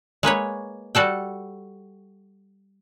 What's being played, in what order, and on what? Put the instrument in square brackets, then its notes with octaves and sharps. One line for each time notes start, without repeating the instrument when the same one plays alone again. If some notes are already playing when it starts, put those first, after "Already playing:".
[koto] G#3 A#3 B4 C#5
G3 F#4 A4 G5